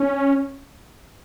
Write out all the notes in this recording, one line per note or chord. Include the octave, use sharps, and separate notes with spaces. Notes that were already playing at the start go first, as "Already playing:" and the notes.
Already playing: C#4